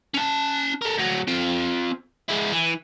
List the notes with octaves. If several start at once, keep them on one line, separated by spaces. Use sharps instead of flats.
C#4 A5
A4 A#4
D2 F#3
C4 F4
G#3 E4
E3